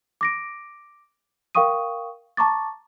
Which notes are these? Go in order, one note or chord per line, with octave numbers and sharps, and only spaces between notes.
D6 A#6 D7
A#4 F5 G5 C#6 D#6 D#7
A5 A#5 C#6 D6 A6